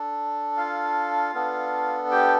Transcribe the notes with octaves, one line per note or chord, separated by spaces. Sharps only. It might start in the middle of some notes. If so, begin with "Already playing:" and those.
Already playing: D4 A4
F4 F5
B3 D4 A4
G4 G5